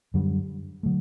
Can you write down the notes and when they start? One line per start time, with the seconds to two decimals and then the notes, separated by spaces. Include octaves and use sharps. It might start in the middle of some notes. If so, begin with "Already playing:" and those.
0.14 F#2 D3 G3
0.83 D3 F#3 A3